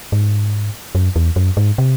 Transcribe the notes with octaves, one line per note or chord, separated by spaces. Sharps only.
G#2
F#2
E2
F#2
G#2
C3